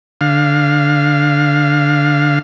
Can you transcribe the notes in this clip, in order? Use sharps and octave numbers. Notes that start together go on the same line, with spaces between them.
D3 F5